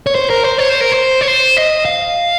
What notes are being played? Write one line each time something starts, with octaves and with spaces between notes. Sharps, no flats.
C#5
C5
A#4
C5
C#5
C5
A#4
C5
C#5
C5
D#5
F5